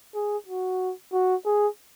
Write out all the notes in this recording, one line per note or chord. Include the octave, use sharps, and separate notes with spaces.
G#4
F#4
F#4
G#4